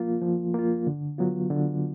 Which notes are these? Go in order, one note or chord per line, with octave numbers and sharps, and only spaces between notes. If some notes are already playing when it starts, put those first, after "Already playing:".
Already playing: F3 A#3 F4
F3
A#3 F4
D3
F#3 B3 F4
D3